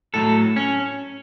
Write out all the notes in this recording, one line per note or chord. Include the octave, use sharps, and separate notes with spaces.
A2 F#3 A4
C#4